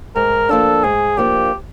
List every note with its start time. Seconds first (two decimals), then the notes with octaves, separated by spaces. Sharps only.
0.16 G#2 A#4
0.49 F3 A#3 D4 A4
0.84 G#2 G#4
1.17 F3 A#3 D4 G4